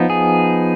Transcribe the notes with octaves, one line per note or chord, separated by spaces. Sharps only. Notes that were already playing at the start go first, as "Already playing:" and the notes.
Already playing: F3 B3 D#4
G#4